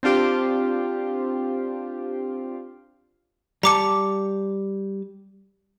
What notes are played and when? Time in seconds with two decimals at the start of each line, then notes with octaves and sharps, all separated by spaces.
0.03 C4 D4 F4 G4 C5
3.63 G3 A5 A#5 D6 C#7